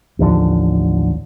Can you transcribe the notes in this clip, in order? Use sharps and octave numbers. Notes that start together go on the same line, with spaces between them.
A1 D#2 D3 F3